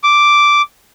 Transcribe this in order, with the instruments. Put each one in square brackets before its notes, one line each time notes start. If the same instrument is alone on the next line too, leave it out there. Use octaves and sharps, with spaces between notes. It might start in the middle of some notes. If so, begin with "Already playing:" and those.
[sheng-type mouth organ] D6